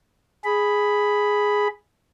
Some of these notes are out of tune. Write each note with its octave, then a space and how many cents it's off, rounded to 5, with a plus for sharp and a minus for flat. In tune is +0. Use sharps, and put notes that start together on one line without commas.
G#4 +0 B5 +0